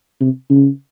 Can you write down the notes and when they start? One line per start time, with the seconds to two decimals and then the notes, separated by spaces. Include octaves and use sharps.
0.21 C3
0.50 C#3